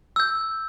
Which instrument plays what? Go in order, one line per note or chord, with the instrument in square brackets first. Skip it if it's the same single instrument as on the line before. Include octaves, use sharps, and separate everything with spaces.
[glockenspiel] E6 G6